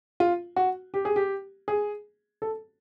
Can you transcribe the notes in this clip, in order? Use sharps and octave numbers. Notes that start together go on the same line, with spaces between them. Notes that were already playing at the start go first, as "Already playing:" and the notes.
F4
F#4
G4
G#4
G4
G#4
A4